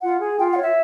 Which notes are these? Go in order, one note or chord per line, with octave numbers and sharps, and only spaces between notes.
F4 F#5
G#4
F4 G5
F#5
C#5
E5